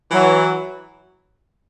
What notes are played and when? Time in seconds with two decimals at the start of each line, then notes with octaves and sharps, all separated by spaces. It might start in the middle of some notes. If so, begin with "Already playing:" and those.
0.11 E3 F#3